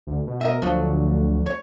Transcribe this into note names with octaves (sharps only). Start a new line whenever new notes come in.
D2
B2
A#4 D#5 E5
D2 F3 F#3 A3
C#5